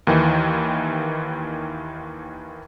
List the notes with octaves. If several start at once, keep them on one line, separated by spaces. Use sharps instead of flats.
D#2 D#3 E3